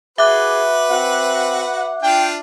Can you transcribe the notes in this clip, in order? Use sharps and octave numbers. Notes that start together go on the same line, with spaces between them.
F#4 G#4 B4 E5 D6 F#6
C4 F#5
D4 F4 G5